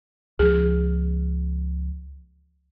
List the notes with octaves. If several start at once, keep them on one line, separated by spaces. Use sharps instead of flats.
C#2 F3 G#4